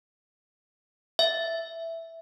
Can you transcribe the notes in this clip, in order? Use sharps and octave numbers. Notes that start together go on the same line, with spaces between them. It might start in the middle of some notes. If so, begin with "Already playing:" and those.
E5